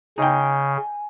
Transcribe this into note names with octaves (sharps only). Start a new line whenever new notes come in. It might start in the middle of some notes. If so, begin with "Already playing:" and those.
C#3 D#4 G5 G#5